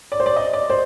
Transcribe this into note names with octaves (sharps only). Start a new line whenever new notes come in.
D5
C5
D5
D#5
D5
C5